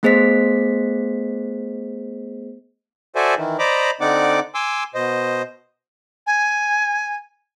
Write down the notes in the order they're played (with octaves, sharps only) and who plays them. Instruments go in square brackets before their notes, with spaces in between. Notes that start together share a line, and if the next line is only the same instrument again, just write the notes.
[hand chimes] A3 B3 G#4 C5 D#5 B6
[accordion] F#4 A4 C5 D5 E5 G#5
D#3 E3
C5 D5 D#5 A#5 B5 D6
D3 C4 D#4 D5 F#5 D6
G#5 C6 D6 E6
B2 C5 D#5
[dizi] G#5